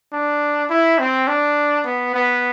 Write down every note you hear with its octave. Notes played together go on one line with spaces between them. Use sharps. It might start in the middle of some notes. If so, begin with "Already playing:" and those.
D4
E4
C4
D4
B3
B3